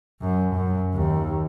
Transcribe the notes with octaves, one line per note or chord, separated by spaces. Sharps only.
F#2
F#2
D#2